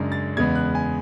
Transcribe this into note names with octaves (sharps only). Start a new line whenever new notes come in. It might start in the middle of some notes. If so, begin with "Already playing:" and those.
Already playing: F#2 C#3 G#3 D4
A6
E2 C#3 G#3 B3 G#6
F#6
G#5